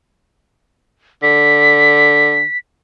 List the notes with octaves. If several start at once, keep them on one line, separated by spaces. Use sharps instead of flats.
D3 B6